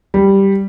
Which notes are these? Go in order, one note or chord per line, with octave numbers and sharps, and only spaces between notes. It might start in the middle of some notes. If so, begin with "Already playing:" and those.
G3